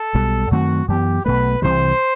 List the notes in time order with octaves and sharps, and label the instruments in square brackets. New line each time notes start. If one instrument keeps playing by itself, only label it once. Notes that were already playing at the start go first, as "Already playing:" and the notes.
Already playing: [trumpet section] A4
[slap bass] B1 B2 G3
[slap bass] F#2 D#3 A3 C4 [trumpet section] F#4
[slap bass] F#2 E3 B3 [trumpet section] G4
[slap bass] B1 B2 A3 [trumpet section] B4
[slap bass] C2 C3 E3 G3 [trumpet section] C5